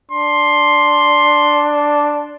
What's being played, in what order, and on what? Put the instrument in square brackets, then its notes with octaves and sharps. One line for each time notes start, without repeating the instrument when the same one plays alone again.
[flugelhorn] D4 [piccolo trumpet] C6